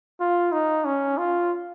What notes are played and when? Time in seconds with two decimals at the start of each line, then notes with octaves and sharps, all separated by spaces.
0.20 F4
0.52 D#4
0.85 C#4
1.18 F4